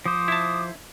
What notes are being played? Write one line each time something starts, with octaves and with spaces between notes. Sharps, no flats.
F3 C5 D6 D#6
E4 A5